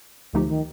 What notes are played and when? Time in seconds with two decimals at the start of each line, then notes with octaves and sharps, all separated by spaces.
0.33 D2 D3 F3 A3 D#4 G4
0.48 D#3